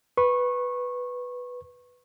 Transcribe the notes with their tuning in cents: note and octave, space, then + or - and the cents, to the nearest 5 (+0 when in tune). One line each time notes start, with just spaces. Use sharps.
B4 +0 C#6 -25